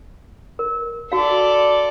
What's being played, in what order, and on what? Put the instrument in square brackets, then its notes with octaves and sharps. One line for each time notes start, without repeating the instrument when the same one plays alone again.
[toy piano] A#4
[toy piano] F#4 F5 [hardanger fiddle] A4 D5